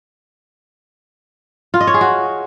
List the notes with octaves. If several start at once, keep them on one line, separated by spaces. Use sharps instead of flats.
F4
D#5
C#5
G#4
F#4